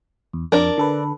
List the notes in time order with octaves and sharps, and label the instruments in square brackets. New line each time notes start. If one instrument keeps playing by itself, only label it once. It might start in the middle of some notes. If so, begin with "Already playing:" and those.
[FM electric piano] E2
[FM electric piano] F2 [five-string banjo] D4 A#4
[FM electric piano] D3 A4 B4